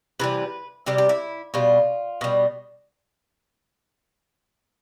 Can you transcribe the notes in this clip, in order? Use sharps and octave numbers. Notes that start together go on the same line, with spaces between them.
C3 E3 G3 B4
C3 G3 G4
G4
E4
B2 G3 F4
B2 G3